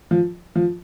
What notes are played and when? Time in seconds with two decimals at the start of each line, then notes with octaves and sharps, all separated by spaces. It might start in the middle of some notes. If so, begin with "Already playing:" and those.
0.11 F3
0.56 F3